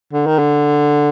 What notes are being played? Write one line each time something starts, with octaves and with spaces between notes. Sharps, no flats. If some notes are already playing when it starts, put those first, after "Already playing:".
D3
D#3
D3